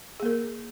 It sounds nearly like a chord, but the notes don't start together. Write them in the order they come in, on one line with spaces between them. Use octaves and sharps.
G#4 A#3 A#4